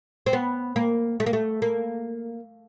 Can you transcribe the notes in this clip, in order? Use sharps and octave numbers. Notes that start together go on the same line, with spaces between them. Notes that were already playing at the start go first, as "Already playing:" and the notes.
C4
B3
A#3
A3
A#3
A3
A#3